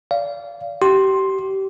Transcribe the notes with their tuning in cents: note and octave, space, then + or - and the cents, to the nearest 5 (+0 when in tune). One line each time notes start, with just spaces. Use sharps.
D5 -30 F5 -20
G4 -25 C6 +10